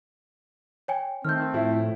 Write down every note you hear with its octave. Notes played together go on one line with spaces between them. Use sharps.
C#5 G5 G#5
D#3 A3 C4 F6 G6
A2 F3 E4